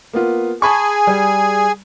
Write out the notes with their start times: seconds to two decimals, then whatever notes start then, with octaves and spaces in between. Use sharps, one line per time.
0.13 A#3 B3 F4
0.62 G#4 G#5 A5 B5 C#6
1.07 G3